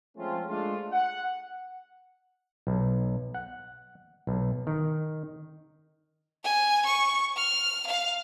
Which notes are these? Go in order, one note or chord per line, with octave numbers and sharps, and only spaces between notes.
F3 G#3 A3 C4 C#4 F4
G#3 A3 D4 F4
F#5
B1
F#5
B1
D#3
G#5
C#6
F6
F5